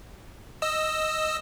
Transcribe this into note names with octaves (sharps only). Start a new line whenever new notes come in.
D#5 E6